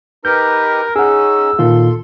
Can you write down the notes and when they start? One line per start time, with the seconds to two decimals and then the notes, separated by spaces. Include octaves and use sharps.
0.25 D#4 G4 A#4 B4 G6
0.96 C#4 D#4 G#4 F#5 E6
1.59 A#2 D#3 F4 A4 C6